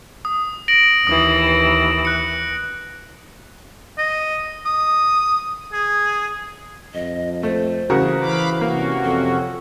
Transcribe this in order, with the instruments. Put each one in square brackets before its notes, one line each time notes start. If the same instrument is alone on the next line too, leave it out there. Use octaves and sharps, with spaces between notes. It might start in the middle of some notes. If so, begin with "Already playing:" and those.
[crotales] D#6
A#6 D7 F#7
[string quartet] D#2 E3 [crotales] D#6
[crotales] F#6 C#7
[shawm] D#5
D#6
G#4
[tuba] F2 [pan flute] D#5
[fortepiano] A3 [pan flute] C5
[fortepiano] C#3 F#4 A#4 [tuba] E3
[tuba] E3 [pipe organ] F5 B5 D6
[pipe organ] C3 C#4 F#4 [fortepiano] A#3
[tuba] F2 [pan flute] A4